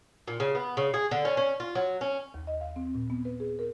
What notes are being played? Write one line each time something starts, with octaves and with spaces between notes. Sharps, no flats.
A#2
C#3
B3
C#3
G#4
D3
C#4
C#4
F4
F#3
C#4
D#2
D#5
F5
C4
A#2
B3
B4
G#4
A#4